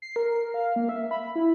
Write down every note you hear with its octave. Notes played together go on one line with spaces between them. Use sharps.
C7
A#4
F5
A#3
E5
B5
E4